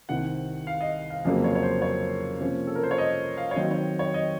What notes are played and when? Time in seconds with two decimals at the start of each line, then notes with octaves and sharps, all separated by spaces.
0.09 C2 C3 D#3 F#5
0.67 F5
0.81 D#5
1.10 F5
1.25 F2 C#3 F#3 A#3 F5
1.44 C#5
1.55 C#5
1.63 C5
1.82 C#5
2.40 C3 F3 A#3 C#4
2.67 A4
2.76 A#4
2.83 C5
2.91 C#5
2.98 D#5
3.37 F5
3.51 C#5
3.56 D#3 F#3 C4 D#5
3.71 C#5
3.99 C#5
4.14 D#5